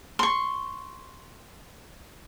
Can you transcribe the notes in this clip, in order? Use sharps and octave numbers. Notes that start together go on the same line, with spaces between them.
C6 C#6